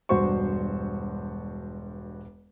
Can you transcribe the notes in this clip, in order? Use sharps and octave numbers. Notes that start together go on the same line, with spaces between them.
E1 G2 F#4 C5 C#6